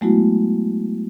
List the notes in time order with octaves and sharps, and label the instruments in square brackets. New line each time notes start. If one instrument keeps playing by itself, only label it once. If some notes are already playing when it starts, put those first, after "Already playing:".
[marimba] F#3 G#3 A3 B3 E4 F#4